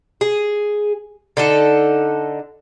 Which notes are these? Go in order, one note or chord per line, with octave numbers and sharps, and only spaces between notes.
G#4
D3 D#4 A4